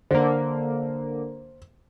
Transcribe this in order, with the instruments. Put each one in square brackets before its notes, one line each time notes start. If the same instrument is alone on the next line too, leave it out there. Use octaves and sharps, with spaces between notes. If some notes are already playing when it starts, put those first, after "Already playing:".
[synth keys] D3 A#3 [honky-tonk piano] C5